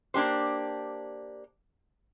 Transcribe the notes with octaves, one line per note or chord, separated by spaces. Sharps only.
A#3 D4 G4 C5